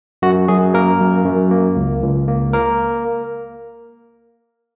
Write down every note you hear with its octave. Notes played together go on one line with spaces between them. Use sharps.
F#2 F#4
F#2 G#4
A#3 A#4
F#2
F#2
A#3
C#2
C#2
A#3
A#3 A#4